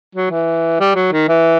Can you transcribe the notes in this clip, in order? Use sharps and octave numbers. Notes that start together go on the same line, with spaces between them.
F#3
E3
G3
F#3
D#3
E3